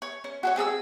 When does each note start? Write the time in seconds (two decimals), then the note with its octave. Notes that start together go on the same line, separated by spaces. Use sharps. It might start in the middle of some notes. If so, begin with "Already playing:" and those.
0.02 C#5
0.24 C#4
0.43 F#4 G#4 C#5
0.56 C4 G#4 A5 E6